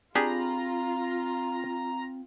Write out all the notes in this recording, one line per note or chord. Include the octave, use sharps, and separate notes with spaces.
C4 D4 F4 G4 G#4 A#5 B5